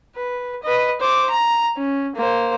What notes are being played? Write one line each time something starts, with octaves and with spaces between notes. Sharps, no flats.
B4
B4 D#5
C5 D6
A#5
C#4
A#3 C5